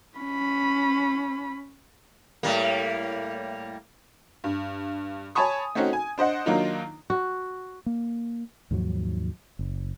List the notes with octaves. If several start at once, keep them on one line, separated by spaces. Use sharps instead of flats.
C#4 B5
A2 G3 A#3
G2
C#5 G#5 A5 B5 C#6 D#6
A3 C4 C#4 D#4 F#4
G#5
D4 C5 D#5 F#5
D#3 F#3 A#3 D4 D#4 F4
F#4
A#3
D#2 G#2 F3 F#3
F#1